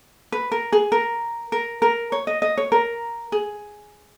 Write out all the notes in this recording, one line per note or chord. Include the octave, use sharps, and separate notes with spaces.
B4
A#4
G#4
A#4
A#4
A#4
C#5
D#5
D#5
C#5
A#4
G#4